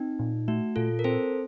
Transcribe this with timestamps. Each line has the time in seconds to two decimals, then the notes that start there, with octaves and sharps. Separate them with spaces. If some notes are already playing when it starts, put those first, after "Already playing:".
Already playing: C4 D#4
0.19 A#2
0.48 A3 F#4
0.76 A#2 F4 A4
0.99 A#4
1.04 C4 A4 C5